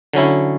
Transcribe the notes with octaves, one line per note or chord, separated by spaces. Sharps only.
D3 F#3 C#4 E4